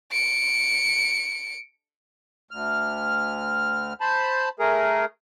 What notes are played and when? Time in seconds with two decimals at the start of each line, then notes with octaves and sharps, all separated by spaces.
0.12 C#7 D7
2.51 D2 F6
4.01 C5 A5 B5
4.59 A3 G#4 A#4